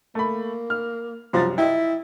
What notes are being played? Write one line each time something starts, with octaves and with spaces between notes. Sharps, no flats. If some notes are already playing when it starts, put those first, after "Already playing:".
A3 A#3 B5
F6
C2 F#2 F3 A6
E4 D#5 G5